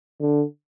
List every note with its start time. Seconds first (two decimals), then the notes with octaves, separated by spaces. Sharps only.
0.20 D3